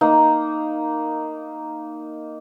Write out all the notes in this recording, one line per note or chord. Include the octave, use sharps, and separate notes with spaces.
A#3 D#4